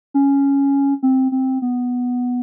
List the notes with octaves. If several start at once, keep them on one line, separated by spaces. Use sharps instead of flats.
C#4
C4
C4
B3